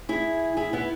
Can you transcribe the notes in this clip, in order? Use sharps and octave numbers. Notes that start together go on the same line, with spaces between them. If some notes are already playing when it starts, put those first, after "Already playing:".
E4 G#4
E4 G#4
B3 E4